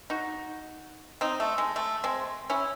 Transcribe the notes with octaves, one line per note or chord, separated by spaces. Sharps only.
D#4 F#4
C4 D#4
A3
G#3
A3
G#3 C4
C#4 E4